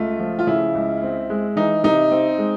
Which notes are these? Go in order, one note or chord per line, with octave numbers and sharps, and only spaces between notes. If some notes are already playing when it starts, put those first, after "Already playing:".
Already playing: C#2 A3 F4
F3
F4
C#3 E4
C#2
C4
G#3
E3 D#4
C3 D#4
C4
G#3